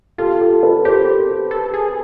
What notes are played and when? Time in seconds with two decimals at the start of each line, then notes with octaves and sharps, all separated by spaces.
0.18 F4 G4 A4
0.41 G4 A4
0.63 A4 B4
0.85 G4 A#4 C5
1.51 A4
1.74 G#4